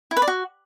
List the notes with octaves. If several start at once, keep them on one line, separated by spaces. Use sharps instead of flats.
E4
B4
D5
F#4